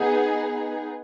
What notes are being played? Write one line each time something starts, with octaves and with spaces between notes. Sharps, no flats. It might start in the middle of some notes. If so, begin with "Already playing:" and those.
Already playing: B3 D#4 G#4